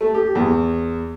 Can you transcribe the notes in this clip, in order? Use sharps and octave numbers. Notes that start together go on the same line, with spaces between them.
A3
G4
E2